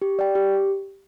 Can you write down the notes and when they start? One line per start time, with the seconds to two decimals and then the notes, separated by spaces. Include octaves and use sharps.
0.02 G4
0.19 D5 G5
0.35 G4